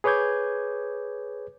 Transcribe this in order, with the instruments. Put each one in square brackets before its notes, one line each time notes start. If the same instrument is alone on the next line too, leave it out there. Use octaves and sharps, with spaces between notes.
[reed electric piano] G#4 B4 C#5 D6 G6 G#6